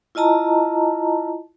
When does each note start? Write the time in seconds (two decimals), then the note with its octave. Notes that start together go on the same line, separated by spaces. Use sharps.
0.15 E4 F4 D#5 A5 A#5